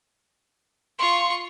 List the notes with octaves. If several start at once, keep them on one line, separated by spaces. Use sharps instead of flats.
F4 C6 C#6